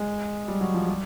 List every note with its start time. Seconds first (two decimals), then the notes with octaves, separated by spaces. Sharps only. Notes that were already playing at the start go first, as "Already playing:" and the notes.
Already playing: G#3
0.48 G3
0.61 F#3
0.74 F3
0.89 G3